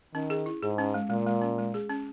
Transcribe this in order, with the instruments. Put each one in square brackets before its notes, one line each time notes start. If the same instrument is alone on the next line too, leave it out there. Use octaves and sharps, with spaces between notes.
[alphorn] D#3 [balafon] C#4
[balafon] G#4
E4
[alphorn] G#2 [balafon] G#4
[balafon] C#4
G#3
[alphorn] A#2 [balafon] G#3
[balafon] G#3
C#4
G#3
G#4
C#4